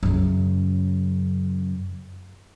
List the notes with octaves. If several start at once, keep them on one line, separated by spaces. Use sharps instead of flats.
F#2 C#3